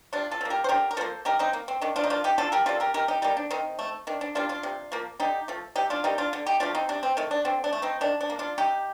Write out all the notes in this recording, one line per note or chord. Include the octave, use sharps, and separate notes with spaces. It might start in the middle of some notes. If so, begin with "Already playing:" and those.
C3 D4 F4
F4 A4
F3 A#3
G4 A#4
C5
D3 G4 A#4
A#4
F3 A#3 A4 C5
D#3 G4 A#4
C4 D#4
A#3
C4
D#3 D4
D4 F4
D#4
A#3 D4 F4
D#4 G4
D3 F4 A4
G4 A#4
G3 A#3 F4 A4
G4 A#4
D#3 G4 A#4
D#4 G4
G3 A#3 D#4 G4
D4
D#3 C4 D#4
A3
D#3 D4
D4
G3 A#3 D4 F4
D4 F4
C3
F3 A#3
D3 D#4 G4
F3 A3
C3 D#4 G4
D4 F4
G3 A#3 D#4 G4
D4 F4
D3
D#4 G4
F3 A3 D4 F4
C4 D#4
C3 D4
C4
D#3 A3
D4
D3 C4
D4
A3
C4 D#4
D#3 D4
D4
A#3
D4 F4
C3 D#4 G4